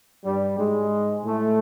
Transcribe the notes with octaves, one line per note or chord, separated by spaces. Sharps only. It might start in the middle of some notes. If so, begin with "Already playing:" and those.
G2 G3
G#2 G#3
A2 A3